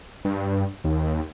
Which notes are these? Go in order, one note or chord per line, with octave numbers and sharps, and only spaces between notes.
G2
D#2